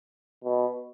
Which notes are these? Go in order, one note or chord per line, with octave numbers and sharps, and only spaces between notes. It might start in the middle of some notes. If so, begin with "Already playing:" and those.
B2